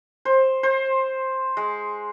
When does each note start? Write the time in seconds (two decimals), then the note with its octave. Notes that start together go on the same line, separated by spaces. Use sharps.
0.25 C5
0.63 C5
1.57 G#3